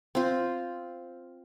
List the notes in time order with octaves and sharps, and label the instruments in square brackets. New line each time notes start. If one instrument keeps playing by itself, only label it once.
[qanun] C4 F4